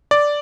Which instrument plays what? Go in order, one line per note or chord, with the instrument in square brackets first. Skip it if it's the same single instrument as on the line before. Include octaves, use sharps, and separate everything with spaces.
[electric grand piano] D5